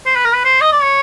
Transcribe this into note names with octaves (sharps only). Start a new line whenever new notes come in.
C5
B4
A#4
B4
C5
D#5
D5
C#5